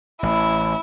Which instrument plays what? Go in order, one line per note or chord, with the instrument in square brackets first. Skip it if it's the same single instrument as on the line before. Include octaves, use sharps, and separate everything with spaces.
[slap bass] A1 [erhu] E4